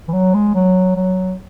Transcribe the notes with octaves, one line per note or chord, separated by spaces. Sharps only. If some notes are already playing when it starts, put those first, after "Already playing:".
E3
F#3
G#3
F#3
F#3